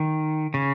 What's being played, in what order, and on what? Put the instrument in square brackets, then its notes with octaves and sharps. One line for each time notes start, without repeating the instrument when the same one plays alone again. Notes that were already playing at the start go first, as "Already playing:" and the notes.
Already playing: [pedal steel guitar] D#3
C#3